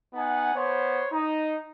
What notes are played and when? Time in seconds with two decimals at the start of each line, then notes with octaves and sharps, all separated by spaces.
0.14 B3 D#4 F#5 G#5
0.55 B3 C5 C#5 C6
1.12 D#4